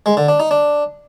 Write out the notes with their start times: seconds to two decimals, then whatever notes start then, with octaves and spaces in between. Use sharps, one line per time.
0.06 G#3
0.17 D3
0.28 D4
0.40 D#4
0.51 D4